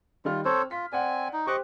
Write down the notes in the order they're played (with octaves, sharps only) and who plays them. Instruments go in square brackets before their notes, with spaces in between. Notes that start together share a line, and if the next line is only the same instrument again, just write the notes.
[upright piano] D#3 G3 F6 [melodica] F4
[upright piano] C4 [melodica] A4 C5 C#5
[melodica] F4 [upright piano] B6
[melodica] C4 G#5 [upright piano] D5 F#5
[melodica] D#4
[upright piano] G4 C5 F#6 [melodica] D#5 C#6 D6